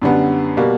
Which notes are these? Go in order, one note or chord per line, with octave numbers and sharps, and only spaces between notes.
F#2 D3 G3 B3
B2 G3 A#3